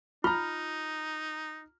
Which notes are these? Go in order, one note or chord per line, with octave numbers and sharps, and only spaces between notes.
D#4 F4 A#5 F6